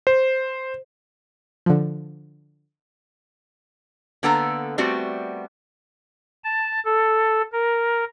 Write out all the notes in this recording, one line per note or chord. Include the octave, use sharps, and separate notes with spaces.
C5
D3 F3
D3 A#3 B3 A4 G#5 A#5
G3 A3 B3 C4 F#4
A5
A4
A#4